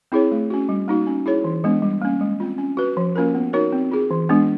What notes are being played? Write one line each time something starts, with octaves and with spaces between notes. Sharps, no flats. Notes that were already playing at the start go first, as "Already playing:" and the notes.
C4 E4 G#4 C#5
A3
C#4 F#4
G3
A#3 D#4 F#4
C#4
E4 G#4 C#5
E3
G#3 B3 D4
G3
A#3 C#4
G#3
C4 F4
C#4
F#4 B4
F3
A#3 C#4 F4 A#4
B3
D#4 F#4 A#4 C#5
C4
F4 G#4
E3
G#3 B3 D4